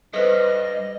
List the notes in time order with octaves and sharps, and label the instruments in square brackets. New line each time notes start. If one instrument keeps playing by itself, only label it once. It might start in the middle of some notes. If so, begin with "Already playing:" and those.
[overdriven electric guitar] G2 [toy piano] A4 B4 C5 [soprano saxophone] D#5